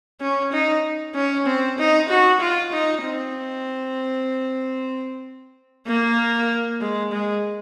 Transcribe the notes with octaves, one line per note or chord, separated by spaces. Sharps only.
C#4
D#4
C#4
C4
D#4
F#4
F4
D#4
C4
A#3
G#3
G#3